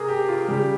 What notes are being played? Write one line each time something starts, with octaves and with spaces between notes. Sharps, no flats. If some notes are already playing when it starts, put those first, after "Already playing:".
Already playing: C3 G#4 A#4
G4
F4
C#3 G3 G4